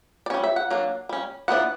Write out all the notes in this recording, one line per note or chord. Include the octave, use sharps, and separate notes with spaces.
D5
G3 C#4 C#5
E5
F#5
F#3 A#3 D4
G3 C#4
E3 B3 D4 F#5